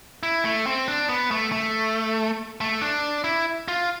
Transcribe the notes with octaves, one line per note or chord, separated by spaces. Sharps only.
E4
A3
C4
D4
B3
A3
A3
A3
D4
E4
F4